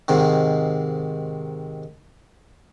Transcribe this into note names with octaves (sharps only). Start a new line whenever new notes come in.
G#2 C3 D#3